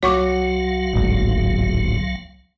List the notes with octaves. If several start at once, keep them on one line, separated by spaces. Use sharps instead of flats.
C2 F#3 F#4 C#5 F5 C#6 D6
D1 G#1